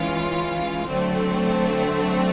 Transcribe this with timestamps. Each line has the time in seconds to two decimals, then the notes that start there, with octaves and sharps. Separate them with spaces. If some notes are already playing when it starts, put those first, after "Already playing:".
Already playing: E3 G#3 C#4 F4
0.89 D3 F#3 A3 C4